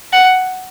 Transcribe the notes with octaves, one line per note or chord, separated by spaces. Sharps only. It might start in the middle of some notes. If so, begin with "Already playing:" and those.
F#5